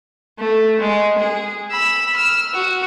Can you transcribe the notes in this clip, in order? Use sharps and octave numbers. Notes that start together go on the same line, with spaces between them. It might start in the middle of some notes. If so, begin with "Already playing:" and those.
A3
G#3
G#4
B5 E6
E6 F6
F#4